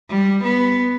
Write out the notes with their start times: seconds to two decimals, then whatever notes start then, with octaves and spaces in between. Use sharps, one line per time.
0.10 G3
0.44 B3